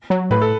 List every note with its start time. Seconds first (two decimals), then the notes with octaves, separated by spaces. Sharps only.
0.10 F#3
0.30 A2 B4
0.41 A4